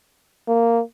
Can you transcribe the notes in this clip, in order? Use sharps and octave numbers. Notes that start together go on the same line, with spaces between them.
A#3